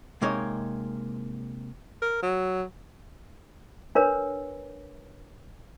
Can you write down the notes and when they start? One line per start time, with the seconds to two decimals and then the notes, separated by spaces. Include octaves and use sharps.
0.22 C3 G#3 A#3 D#4 C#5
2.02 A#4
2.22 F#3
3.95 D4 A#4 B4 C#5